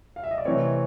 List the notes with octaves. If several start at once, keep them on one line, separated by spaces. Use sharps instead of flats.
F5
E5
D#5
D5
C3 E3 A3 C4 C#5